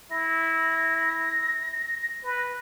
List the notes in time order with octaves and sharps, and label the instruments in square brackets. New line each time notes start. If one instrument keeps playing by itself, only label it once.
[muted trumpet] E4 [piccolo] A#6
[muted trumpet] B4